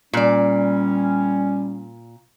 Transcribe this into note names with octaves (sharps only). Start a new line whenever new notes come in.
A#2 G3 C#4 D5